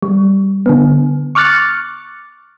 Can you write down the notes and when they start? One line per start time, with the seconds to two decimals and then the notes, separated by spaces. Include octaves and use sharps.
0.02 G3
0.66 D3 B3
1.35 C#6 D6 F6 F#6 A6 C#7